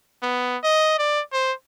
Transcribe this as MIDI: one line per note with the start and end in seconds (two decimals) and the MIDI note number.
0.23 0.57 59
0.64 0.95 75
0.99 1.22 74
1.33 1.53 72